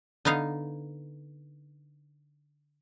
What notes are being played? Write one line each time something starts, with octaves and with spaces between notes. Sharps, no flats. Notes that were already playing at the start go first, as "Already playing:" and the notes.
D3 B3 D#4 F5